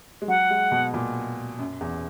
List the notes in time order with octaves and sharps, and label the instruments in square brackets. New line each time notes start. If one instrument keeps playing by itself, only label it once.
[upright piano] G#3
[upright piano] F#3 [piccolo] F#5
[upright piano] G#3
B2
A#2
F#2
E2